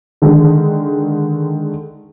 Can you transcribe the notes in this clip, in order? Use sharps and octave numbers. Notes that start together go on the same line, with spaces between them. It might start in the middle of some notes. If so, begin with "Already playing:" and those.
D3 D#3 G#3